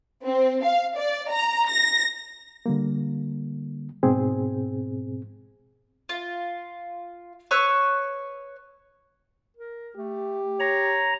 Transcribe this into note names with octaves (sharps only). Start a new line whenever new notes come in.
C4
F5
D5
A#5
A#6
D3 G3 A#3
G#2 B2 C4 G#4
F4
B4 C#5 C#6 E6
A#4
A3 G4
C#5 A#5